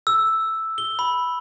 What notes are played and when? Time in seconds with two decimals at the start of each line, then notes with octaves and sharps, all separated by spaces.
0.07 E6
0.78 G7
0.99 B5